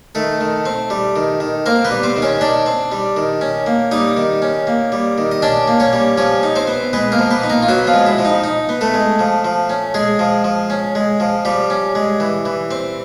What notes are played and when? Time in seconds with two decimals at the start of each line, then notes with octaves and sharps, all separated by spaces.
0.15 D#3 A3 A4
0.41 D#3
0.65 C4
0.90 G3
1.16 D#3
1.40 D#3
1.66 A#3 C4 A#4
1.85 B3 B4
1.91 G3
2.03 C4 C5
2.16 D#3
2.22 C#4 C#5
2.41 D#3 D4 D5
2.66 C4
2.92 G3
3.17 D#3
3.41 C#4
3.66 A#3
3.91 G3 D#4 D#5
4.17 D#3
4.42 C#4
4.67 A#3
4.92 G3
5.18 D#3
5.32 D#5
5.42 C#4 D4 D5
5.68 A#3
5.80 C#4 C#5
5.93 G3
6.17 F3 C#4 C#5
6.43 D#4
6.56 C4 C5
6.67 B3
6.93 G#3 B3 B4
7.12 A#3 A#4
7.18 F3
7.31 B3 B4
7.43 D#4
7.50 A#3 A#4
7.62 F4
7.68 F#3 B3 F#4
7.87 F3 F4
7.93 G#3
8.06 E4
8.18 F3
8.25 D#4
8.44 D#4
8.69 B3
8.81 A3 A4
8.94 G#3
9.19 F3
9.44 F3
9.70 C#4
9.94 G#3 G#4
10.19 F3
10.44 F3
10.70 C#4
10.95 G#3
11.20 F3
11.45 F3 G3 G4
11.70 C#4
11.95 G#3
12.20 E3
12.45 E3
12.71 C4